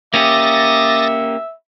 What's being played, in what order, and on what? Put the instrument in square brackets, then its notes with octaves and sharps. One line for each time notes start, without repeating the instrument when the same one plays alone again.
[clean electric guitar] A#3 C#4 G4 [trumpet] E5 [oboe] D6 [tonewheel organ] D#6 A6 A#6